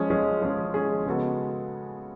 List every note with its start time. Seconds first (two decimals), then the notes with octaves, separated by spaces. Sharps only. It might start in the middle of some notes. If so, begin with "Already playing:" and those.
Already playing: F3 G#3 C#4 G#4
0.10 F3 G#3 C#4 G#4
0.42 F3 G#3 C#4 G#4
0.74 F3 G#3 C#4 G#4
1.06 C#3 G#3 B3 F#4 A4